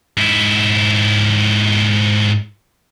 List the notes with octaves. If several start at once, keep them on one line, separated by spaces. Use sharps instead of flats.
G#2 E4